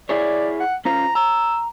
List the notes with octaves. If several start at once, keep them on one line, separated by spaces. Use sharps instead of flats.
E4 G#4 C#5 D5
F#5
C#4 F4 C5 A#5
A#5 E6